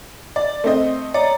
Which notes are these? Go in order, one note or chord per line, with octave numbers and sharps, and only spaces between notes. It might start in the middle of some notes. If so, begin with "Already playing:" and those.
D5
A3 C4 D#5
C#5 D5 A#5